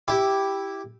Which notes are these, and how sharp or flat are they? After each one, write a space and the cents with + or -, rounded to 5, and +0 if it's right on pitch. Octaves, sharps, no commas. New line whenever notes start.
E4 +0 G4 +0